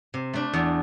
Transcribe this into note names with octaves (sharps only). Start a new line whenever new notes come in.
C3
A3 D4
E2